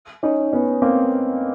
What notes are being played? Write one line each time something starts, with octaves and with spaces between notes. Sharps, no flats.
C#4 D#4
B3 C#4
A#3 C4